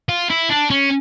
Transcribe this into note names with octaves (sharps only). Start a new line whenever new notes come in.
F4
E4
D4
C#4